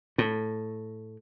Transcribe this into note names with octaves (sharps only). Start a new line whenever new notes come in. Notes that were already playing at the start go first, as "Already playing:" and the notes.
A2